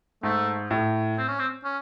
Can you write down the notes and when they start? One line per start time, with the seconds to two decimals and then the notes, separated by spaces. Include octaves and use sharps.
0.23 G#2 A3
0.71 A2
1.18 C4
1.28 C#4
1.39 C4
1.64 C#4